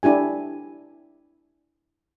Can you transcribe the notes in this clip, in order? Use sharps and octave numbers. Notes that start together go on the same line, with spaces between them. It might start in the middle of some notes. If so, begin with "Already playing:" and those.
D4 E4 G4 G#5